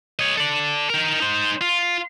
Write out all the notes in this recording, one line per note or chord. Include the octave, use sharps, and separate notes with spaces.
C#5 D#5
A4 D5
D#4 A#4
D#4 C5
F4